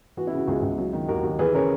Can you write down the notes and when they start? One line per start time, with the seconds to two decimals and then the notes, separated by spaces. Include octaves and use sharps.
0.17 E3 F#4
0.27 E4
0.32 C#3 F#4
0.48 C#2 E4 G#4
0.62 C#2
0.78 F#3
0.93 D#3
1.08 D#2 F#4 A#4
1.23 D#2
1.39 E3 G#4 B4
1.54 C#3 A#4 C#5